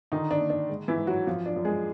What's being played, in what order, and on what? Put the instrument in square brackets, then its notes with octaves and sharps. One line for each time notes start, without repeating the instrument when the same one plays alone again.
[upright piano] D3 D#3 D#4
D4
A#3
D4
G#3
E3 E4
G#2
F#3 F#4
F#2 F3 F4
D4
F#2
G#3 G#4